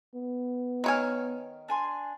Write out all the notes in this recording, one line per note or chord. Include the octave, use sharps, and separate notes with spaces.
B3
D#3 C#5 G#5 F6 F#6
D4 G#5 C6